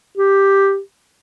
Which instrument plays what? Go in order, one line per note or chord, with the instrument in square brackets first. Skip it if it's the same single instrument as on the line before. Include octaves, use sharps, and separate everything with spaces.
[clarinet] G4